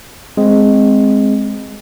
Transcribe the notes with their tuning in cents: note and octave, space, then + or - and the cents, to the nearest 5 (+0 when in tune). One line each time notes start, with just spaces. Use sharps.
G#3 +0 C4 +0